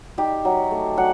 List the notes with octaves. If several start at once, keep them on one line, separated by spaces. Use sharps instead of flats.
D#4 G4
F#3
A3
F#3 F#5